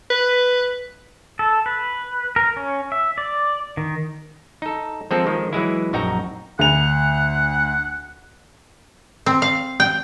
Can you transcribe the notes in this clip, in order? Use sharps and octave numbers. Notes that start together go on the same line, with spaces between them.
B4
A4
B4
A#4
C#4
E5
D5
D#3
D#4 A4
F3 G#3 A#3 C4 A4
D#3 F3 G#3
E3 F#3 G#3 E4
A#1 F#2 D#4 F#4 G5 A#5
D2 F#5 F7
C4
F5
G5